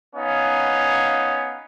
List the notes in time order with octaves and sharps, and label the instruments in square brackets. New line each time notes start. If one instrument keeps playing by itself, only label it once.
[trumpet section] B3 C#4 D#4 F5